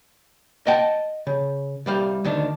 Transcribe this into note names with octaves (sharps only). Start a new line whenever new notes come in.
D#5 F#5 G5 A5
C#3
C2 G3 F5
D2 D#3 D4